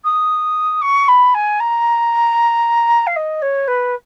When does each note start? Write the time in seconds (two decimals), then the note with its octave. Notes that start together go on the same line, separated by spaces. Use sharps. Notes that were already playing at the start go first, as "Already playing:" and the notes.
0.04 D#6
0.81 C#6
1.08 B5
1.34 G#5
1.60 A#5
3.06 F5
3.16 D#5
3.42 C#5
3.67 B4